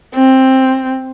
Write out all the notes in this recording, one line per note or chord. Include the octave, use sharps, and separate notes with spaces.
C4